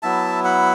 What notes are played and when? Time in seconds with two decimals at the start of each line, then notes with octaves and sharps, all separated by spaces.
0.03 F#3 B3 E4 E5 A5
0.44 F#5 B5